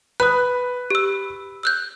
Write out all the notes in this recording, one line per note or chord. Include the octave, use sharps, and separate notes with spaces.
B4 D#6 F#6
G4 E6
E6 F#6 G6